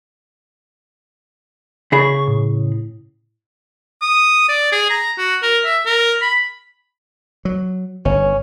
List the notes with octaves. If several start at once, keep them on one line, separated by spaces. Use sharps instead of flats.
C#3 G#4 B5 C#6
A2
D#6
D5
G#4
A#5
F#4
A#4
E5
A#4
B5
F#3
G1 C#4